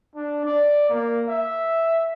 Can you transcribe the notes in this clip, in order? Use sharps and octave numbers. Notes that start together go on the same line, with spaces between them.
D4
D5
A#3
E5